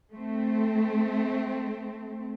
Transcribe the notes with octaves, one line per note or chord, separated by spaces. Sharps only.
A3 C4